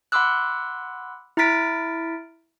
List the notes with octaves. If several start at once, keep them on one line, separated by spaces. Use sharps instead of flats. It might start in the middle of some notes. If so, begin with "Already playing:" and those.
F#5 B5 C6 D6 E6 F#6
E4 A#5 F6 A6 B6 D7